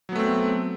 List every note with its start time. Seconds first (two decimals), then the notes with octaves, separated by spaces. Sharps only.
0.09 F#3
0.12 B3
0.16 A3
0.19 C4